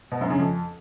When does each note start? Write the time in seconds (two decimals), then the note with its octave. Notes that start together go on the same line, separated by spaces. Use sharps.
0.12 B2
0.21 F#2
0.30 C#3
0.40 F2